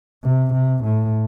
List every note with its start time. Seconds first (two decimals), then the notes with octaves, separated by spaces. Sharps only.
0.24 C3
0.54 C3
0.84 A2